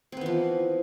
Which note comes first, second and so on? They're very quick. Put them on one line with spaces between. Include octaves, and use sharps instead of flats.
C4 B3 E3 F3